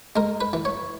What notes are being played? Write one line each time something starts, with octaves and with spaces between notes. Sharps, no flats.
G#3 A#4
B4
E3
C#5